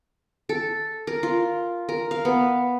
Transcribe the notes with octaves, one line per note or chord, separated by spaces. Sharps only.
A4
A#4
F4
A#4
F5
B3